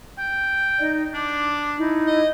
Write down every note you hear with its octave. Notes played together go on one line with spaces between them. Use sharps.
G5
D#4 D5 D#5
D4 D6
D#4 E4
D#5